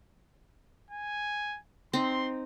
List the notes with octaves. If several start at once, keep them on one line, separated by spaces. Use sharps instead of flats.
G#5
C4 D#4 C6